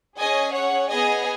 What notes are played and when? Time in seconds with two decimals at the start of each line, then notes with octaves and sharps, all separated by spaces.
0.18 C#4 G#4 D#5 G#5
0.53 C#5 F#5
0.90 B3 G#4 D#5 G#5